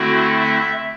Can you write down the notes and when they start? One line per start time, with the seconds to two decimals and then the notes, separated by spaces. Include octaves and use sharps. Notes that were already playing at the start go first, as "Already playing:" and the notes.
Already playing: D3 A3 C4 E4 F#4
0.40 E5